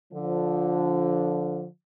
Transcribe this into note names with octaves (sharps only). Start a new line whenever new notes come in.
D3 F3